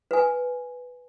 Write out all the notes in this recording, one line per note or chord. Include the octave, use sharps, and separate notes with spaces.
B4 G#5